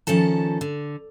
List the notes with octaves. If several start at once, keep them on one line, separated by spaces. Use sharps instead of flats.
D#3 F3 C#4 A4 A5
D3